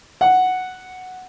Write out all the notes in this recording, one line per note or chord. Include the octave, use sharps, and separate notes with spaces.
F#5